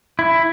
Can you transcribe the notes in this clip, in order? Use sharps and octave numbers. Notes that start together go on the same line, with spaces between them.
E4